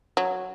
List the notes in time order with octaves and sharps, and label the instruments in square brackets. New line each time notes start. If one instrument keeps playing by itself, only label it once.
[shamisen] F#3